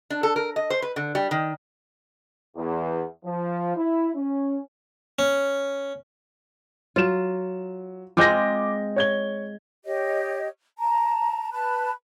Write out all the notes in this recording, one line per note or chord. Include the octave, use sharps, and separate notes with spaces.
D4
A4
A#4
D#5
C5
B4
D3
G3
D#3
E2
F3
E4
C#4
C#4
F#3 F4 E7
G#3 C4 F4 D6 G6 A#6
C#5 G#6 G7
G4 C#5 D#5
A5 A#5
B4 A5 B5 F#6